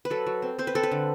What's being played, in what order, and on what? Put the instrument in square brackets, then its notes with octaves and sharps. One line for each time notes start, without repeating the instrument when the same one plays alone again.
[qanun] B4
F#3 A4
F#3
C4
C4 C5
B4
C4 A4
B4
D3